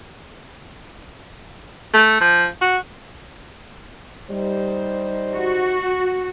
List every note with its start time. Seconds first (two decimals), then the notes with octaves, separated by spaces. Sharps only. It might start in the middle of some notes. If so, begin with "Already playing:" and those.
1.94 A3
2.21 F3
2.61 F#4
4.31 G3 D#4 C5
5.34 F#4